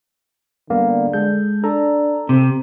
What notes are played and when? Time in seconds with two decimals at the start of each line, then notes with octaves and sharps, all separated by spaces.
0.70 D3 G3 A#3 B3
1.13 G#3 G#4 A4 G6
1.64 D4 A4 A#5
2.29 C3 C4